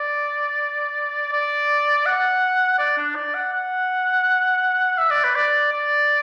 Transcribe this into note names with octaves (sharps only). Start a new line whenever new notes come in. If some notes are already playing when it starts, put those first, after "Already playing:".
Already playing: D5
D5
F#5
D5
D4
D5
F#5
F#5
E5
D5
B4
D5
D5